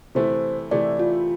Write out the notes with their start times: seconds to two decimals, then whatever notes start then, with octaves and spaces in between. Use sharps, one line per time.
0.15 C3 E3 A3 E4 C5
0.71 C3 E3 A3 E4 D5
0.99 F4